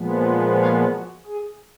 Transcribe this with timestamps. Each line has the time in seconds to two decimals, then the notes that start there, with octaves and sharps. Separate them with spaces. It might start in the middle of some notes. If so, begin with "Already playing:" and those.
Already playing: A#2 F3 G#3 B3
0.57 C#5 F5
0.91 F#4
1.26 G#4